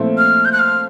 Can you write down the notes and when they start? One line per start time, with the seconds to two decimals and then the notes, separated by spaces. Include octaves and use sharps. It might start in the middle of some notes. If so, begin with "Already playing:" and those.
Already playing: A#2 F3 A3 C4 E4
0.18 F6
0.45 G6
0.52 F#6
0.59 F6